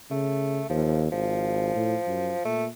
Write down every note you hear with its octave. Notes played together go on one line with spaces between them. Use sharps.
C#3 A3
D#2 F3
G#1 F3
A2
F#2
A#2 A3